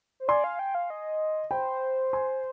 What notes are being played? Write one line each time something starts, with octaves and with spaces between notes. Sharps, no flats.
C5
D5 G#5 C6
F5
G5
F5
D#5
C5 G5 B5
G#5 C6